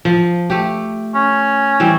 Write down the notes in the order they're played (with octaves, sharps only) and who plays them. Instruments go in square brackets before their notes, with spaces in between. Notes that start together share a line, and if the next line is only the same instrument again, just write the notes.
[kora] F3
A3 G4
[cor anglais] C#4
[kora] E3 G3 C4